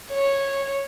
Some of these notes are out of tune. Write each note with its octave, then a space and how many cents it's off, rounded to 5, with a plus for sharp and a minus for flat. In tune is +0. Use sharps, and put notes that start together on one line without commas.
C#5 -10